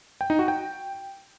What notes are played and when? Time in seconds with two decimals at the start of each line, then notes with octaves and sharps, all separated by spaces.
0.21 G5
0.30 D#4
0.39 F#4
0.48 G5